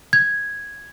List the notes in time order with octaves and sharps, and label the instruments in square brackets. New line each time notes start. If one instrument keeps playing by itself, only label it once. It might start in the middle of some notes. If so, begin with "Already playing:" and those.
[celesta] G#6